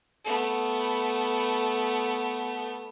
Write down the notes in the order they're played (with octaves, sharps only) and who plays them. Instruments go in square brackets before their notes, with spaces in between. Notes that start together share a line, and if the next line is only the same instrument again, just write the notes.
[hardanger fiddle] A3 B3